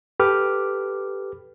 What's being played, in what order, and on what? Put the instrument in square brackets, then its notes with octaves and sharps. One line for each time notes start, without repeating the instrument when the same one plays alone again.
[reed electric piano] G4 A4 B4 D6 F6